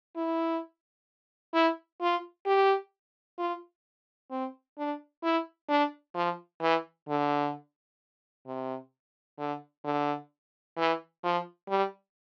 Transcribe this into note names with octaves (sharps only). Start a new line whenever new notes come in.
E4
E4
F4
G4
F4
C4
D4
E4
D4
F3
E3
D3
C3
D3
D3
E3
F3
G3